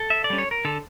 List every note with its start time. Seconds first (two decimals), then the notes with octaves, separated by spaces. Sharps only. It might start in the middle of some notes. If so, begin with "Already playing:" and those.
Already playing: A4
0.10 E5
0.24 D5
0.30 G3 C#4
0.38 C#5
0.51 A#4
0.65 D3 A4